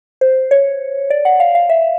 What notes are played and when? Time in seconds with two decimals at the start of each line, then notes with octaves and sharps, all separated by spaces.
0.21 C5
0.51 C#5
1.10 D5
1.25 F#5
1.40 F5
1.55 F5
1.70 E5